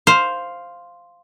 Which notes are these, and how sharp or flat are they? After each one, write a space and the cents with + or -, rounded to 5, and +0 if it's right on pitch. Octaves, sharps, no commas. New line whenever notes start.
C5 +0 F5 +0